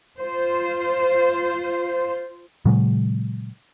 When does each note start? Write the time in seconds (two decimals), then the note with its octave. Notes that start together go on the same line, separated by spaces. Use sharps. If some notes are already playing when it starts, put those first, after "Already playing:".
0.19 F4 C5
2.65 A#2 C#3 F#3 G#3